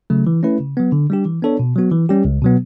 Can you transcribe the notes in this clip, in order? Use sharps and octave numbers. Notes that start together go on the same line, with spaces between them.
C#3 F#3 A3
E3
A3 C#4 E4 B4
C#3
F#3 B3
D3
G3 D4 G4
E3
B3 D4 A4 C#5
B2
F#3 B3 F#4
E3
G3 C#4 G4
C#2
B2 F#3 B3